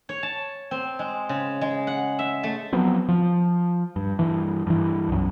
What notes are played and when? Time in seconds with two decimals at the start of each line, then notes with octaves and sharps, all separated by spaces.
0.09 C#5
0.23 A5
0.71 C4
0.99 G#3
1.29 C#3
1.61 G#3
1.87 F#5
2.19 E5
2.43 A3
2.73 F3 F#3 B3 C4
3.08 F3
3.96 G2
4.19 G2 E3
4.67 G2 E3
5.09 B1 F#2